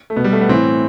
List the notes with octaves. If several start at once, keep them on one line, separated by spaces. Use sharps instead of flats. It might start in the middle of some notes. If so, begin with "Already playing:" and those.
A3
B2 B3
G3
A3
B3
A2 E3 C4